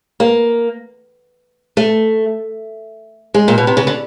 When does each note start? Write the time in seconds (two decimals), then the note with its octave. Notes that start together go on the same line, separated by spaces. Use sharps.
0.20 A#3
1.77 A3
3.34 G#3
3.48 A#2
3.58 B2
3.67 C3
3.77 C#3
3.87 D3